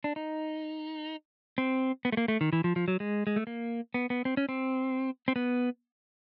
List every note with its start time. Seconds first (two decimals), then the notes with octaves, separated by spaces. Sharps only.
0.04 D4
0.16 D#4
1.58 C4
2.05 B3
2.12 A3
2.17 A#3
2.28 A3
2.41 D#3
2.53 E3
2.64 F3
2.76 F3
2.88 F#3
3.00 G#3
3.27 G#3
3.36 A3
3.47 A#3
3.94 B3
4.10 B3
4.25 C4
4.37 C#4
4.49 C4
5.28 C4
5.36 B3